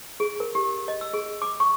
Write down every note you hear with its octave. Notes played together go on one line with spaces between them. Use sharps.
G#4
A#4
G4
D#5
E6
G#4
D6
C#6